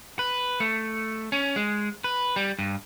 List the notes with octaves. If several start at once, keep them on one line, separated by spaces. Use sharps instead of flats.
B4
A3
C#4
G#3
B4
G3
G2